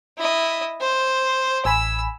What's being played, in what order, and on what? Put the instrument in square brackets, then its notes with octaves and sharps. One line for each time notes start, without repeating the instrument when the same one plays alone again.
[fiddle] E4 D#5
C5
[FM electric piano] A1 G#5 B5 [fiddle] E6